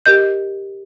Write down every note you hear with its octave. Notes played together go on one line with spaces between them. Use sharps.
G4 A#4 D#5 G6